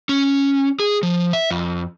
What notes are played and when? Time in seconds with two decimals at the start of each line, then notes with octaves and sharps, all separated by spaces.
0.09 C#4
0.79 G#4
1.03 F3
1.33 E5
1.51 F2